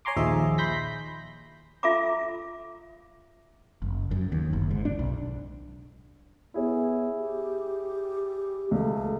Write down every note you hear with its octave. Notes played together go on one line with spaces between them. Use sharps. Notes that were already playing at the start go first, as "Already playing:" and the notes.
C#5 G#5 A#5 C6 D6
A#1 D#2 F3 D#4 G#4 E5
B5 C6 G6 A#6 B6
F4 A4 E5 F5 A#5 D6
F#1
F#2
D#2
F#1
G#2
D4
B1
B3 E4 G#4 C#5
G4
C#2 A3